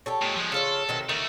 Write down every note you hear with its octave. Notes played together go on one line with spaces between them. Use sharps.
G4 A4 C#5
A#2 G#3
F3 G#3
C#3 F4 A4 C#5
C3 D#3 F#3
D#3 A3 F#4